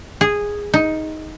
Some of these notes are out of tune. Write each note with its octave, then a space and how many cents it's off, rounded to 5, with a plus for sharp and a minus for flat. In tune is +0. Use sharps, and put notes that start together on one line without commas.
G#4 -10
D#4 +10